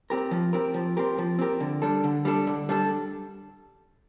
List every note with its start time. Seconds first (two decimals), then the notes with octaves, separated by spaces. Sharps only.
0.10 C4 G4 A#4
0.31 F3
0.53 C4 G4 A#4
0.74 F3
0.97 C4 G4 A#4
1.18 F3
1.39 C4 G4 A#4
1.60 D3
1.82 G3 D4 A4
2.04 D3
2.25 G3 D4 A4
2.47 D3
2.69 G3 D4 A4